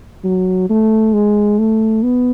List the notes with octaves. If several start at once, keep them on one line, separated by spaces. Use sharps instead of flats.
F#3
A3
G#3
A3
B3